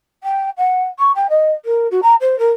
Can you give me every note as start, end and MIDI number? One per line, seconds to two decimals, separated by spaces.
0.23 0.50 79
0.57 0.84 78
0.99 1.12 85
1.15 1.27 79
1.29 1.51 75
1.65 1.87 70
1.91 2.00 66
2.02 2.15 82
2.20 2.38 72
2.38 2.51 70